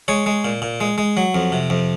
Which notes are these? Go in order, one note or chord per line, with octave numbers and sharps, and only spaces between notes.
G#3 C#5
G#3
A#2
A#2
G#3
G#3
F#3
F2
C3
F2